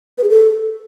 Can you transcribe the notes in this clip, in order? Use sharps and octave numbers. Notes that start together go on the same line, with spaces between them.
B4
G#4
A4